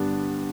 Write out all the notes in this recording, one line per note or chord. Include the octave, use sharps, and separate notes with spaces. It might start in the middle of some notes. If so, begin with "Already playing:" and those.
Already playing: G2 D3 G3 B3 D4